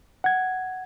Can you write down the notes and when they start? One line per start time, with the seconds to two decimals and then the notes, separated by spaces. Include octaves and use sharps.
0.24 F#5 G#6